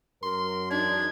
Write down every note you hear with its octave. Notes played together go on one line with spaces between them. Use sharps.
F#2 A#4 C6
E2 D4 D#4 G#6